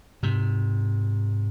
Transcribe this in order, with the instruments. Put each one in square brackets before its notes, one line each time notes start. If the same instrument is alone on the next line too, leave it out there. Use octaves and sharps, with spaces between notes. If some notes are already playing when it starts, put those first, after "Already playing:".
[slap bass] G#2 C3